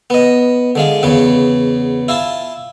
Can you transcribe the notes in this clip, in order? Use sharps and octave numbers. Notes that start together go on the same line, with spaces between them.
B3 D#5
D3 G#3 F4
E2 C#3 B3
E4 F4 A5